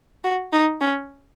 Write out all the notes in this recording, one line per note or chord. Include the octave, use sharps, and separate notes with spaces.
F#4
D#4
C#4